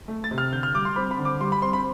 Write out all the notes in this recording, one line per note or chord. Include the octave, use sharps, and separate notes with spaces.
A3
A6
C3
F6
D3 G6
F6
G3 D6
C6
C4 B5
B5
D3
D6
G3 C6
B5
C4 C6
B5